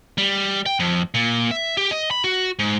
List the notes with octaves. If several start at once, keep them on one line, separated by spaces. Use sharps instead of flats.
G3
G5
F2
A#2
E5
G4
D#5
B5
F#4
G#2